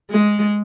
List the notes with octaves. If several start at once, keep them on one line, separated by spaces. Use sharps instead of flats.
G#3